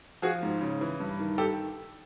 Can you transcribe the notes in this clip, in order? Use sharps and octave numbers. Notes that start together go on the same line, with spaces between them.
F3 F#4 G#4
G#2
C#3
E3
G2
D#3
G4 A4